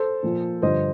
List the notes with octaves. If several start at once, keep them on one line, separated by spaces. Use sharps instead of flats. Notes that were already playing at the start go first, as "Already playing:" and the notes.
Already playing: A4 C5
A#2 F3
G2 D3 F3 C5 D#5